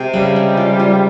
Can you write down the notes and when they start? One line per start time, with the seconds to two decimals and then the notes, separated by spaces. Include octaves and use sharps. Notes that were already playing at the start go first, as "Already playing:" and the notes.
Already playing: C3 G#3
0.14 C#3 G3
0.36 G#3
0.57 F4
0.80 F4